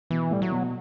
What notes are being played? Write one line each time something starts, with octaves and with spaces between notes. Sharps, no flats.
B2 E3
A2 G3
F#3
B2